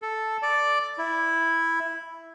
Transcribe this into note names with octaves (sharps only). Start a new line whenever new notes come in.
A4
D5
E4